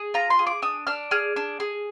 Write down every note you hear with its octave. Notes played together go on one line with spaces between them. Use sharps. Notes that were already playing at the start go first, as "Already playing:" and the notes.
Already playing: G#4
F4 A#5
C6
G#4
D6
D4 D#6
D4 F6
G#4 F6
D4
G#4